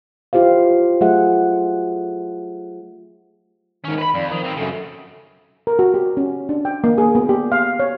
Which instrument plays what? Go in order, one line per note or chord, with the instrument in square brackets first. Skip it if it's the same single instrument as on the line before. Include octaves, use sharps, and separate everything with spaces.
[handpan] E4 F4 G4 C5 F5
F#3 A3 F4 G#4 E5 F#5
[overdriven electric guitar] G#2 C#4 [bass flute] D#3
[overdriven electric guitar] B4 B5
[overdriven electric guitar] F2 [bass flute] D5
[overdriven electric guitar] D#3 [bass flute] F3
[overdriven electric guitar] D#3 C4
[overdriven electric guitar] F#2 C#3 [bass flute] A4
[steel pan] A#4
F#4
G4
C#4
D4
G5
A#3
G#4
B3
G4
F5
C#5